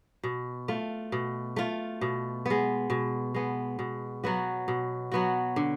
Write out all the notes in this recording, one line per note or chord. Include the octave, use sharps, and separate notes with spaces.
B2
A3 F4
B2
A3 F4
B2
G#3 B3
B2
G#3 B3
B2
F#3 B3 F#4
B2
F#3 B3 F#4
D3